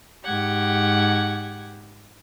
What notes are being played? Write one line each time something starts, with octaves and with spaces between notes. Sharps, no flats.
G#2 G4 F#5 G#6